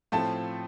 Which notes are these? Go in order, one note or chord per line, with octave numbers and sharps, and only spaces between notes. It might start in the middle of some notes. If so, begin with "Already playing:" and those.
A2 F3 A3 C4 F4 A5